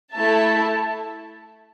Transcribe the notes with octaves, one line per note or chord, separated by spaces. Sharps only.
A3 E4 A4 E5 A5